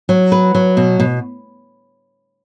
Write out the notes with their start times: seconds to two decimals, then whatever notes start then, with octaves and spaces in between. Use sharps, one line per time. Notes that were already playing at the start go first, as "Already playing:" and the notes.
0.09 F#3
0.32 B4
0.55 F#3
0.77 B2
1.00 B2